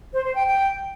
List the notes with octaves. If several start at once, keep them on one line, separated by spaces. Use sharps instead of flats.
C5
C5
G5
G5